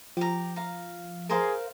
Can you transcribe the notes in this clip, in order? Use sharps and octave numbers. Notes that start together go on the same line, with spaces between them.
F3 G4 A#5
F5 A#5
G#4 A#4 C5 F5